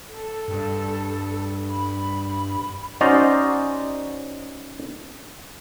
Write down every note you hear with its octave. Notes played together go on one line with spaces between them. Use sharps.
A4
G2
B5
C#4 D#4 F#4 C5 D5 D#5